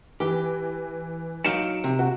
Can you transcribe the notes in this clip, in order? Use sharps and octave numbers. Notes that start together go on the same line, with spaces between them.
E3 G4
F#3 D#4 F5 C#7 D7 E7
C3
F#4